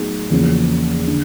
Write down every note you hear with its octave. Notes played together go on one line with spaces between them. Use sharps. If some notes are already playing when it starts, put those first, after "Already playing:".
Already playing: A2 F#3 B3 D#4 G#4
E2 C#3 F3 A#3 C#4
D3